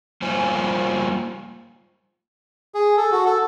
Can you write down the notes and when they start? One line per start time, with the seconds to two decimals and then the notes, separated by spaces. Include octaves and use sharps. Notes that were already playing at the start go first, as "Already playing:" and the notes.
0.22 G3 A#3 F4 C5 G#5
2.75 G#4
2.97 A4
3.12 F#4
3.25 A4